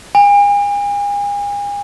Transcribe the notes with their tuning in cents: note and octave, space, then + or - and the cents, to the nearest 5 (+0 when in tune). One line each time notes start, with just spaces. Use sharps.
G#5 -40